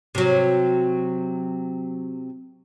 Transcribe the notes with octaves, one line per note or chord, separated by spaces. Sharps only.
C3 F#3